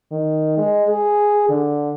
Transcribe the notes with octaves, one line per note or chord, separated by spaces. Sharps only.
D#3
G#3
G#4
D3